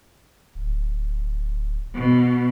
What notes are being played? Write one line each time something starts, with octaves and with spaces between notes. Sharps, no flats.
D1
B2